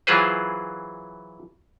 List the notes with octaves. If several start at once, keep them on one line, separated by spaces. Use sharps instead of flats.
E3 F#3 F4 G#4 B4 C5